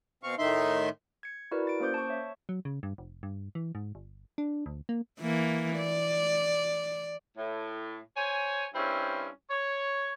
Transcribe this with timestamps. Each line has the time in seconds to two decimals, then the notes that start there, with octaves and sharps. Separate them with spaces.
0.23 B2 C4 F5 C#6
0.38 A2 D#3 D#4 E5 C6
1.23 G#6 C#7
1.51 E4 F#4 A#4 B4 D5
1.67 A6 D7
1.80 A#3 C#4 C5 D6 G6
1.94 A5 C#6
2.09 C#5 E5
2.49 F#3
2.65 C#3
2.83 G2
2.98 F1
3.23 G2
3.55 E3
3.75 G#2
3.95 G1
4.38 D4
4.66 D2
4.89 A#3
5.21 E3 A#3
5.77 D5
7.37 A2
8.16 C5 C#5 G#5
8.75 G2 C4 C#4 E4
9.50 C#5